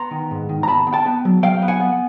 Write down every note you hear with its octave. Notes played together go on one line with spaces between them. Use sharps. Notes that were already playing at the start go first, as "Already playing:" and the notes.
Already playing: B3 A#5 C6
D#3
G#2
D#3
A#5
B3 A5 B5
B3
G5 A5
B3
F#3
F#3 F5 G5
B3
F#5 G#5
B3